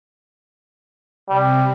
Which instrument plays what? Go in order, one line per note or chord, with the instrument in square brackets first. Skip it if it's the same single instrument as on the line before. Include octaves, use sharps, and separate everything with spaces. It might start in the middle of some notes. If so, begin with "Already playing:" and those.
[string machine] C3 [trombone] G3